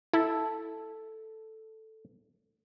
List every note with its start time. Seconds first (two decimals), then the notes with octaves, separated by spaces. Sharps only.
0.13 E4 A4